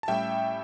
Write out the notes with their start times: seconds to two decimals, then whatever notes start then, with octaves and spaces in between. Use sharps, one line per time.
0.03 A5
0.08 A2 G3 C#4 E4 E5 G5